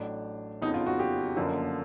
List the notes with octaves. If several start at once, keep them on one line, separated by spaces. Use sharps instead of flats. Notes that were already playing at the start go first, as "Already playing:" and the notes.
Already playing: A1 A2 F#3 D4
F#1 F2 C#3 F#3 B3 D#4
F4
F#4
G4
F#1 F#2 D3 F3 A#3